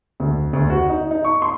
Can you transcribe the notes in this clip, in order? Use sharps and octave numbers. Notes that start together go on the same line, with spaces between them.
D2
D2
F#4
D#4
D#4
C#6
C6